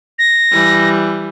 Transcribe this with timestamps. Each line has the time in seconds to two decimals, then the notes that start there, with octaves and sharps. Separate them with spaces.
0.19 A#6
0.52 E3 G3